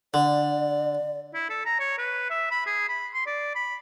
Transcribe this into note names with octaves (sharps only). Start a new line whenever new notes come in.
D3 D5
E4
A4
A#5
C#5
B4
E5
B5
G#4
B5
C6
D5
B5